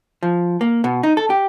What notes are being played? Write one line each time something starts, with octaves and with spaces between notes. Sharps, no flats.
F3
A#3
B2
D#4
A4
G4